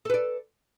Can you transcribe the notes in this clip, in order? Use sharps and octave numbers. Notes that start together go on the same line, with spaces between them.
A4 B4 D5